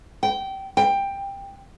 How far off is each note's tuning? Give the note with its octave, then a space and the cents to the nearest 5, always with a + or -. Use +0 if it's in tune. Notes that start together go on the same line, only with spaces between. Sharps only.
G5 -20
G5 +15